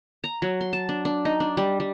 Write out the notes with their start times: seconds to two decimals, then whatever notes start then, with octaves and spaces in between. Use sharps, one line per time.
0.24 A#5
0.42 F#3
0.61 C6
0.73 A5
0.89 D4
1.05 D4
1.25 D#4
1.40 D4
1.57 G3
1.80 G3